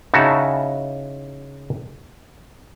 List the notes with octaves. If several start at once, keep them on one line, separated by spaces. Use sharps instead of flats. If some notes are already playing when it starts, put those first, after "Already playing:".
C#3 D#4 E4 F#4 A5